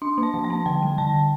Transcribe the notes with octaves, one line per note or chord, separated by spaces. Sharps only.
D4 C6
A#3
A5
F3
A5
A#3
D3 G5
G3
D3 A5
D3